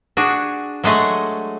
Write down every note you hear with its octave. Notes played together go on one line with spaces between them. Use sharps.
D4 F#4 G#4
F#3 G#3 A3 G#4 F#5